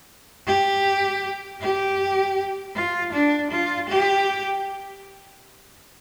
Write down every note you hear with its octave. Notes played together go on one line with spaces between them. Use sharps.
G4
G4
F4
D4
F4
G4